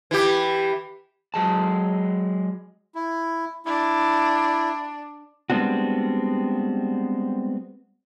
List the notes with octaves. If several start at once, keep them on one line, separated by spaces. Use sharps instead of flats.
E3 G4
F#3 G#3 A5
E4
D4 E4
G3 G#3 B3 C4 D4 F#4